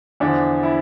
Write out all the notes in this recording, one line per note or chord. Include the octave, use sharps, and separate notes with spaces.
E2 D3 F3 D4
E4